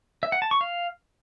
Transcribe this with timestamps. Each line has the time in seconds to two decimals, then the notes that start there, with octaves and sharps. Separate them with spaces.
0.23 E5
0.32 F#5
0.42 A5
0.51 C#6
0.61 F5